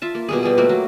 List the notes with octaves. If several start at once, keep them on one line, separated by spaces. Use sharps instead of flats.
F4 E5 A5
A#3
B2 G3 G#4
G3 G#4
A3 A#3 F#4 C5
F#3